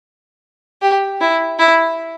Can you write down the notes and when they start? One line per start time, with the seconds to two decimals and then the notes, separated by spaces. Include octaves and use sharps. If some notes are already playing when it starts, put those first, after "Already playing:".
0.82 G4
1.21 E4
1.59 E4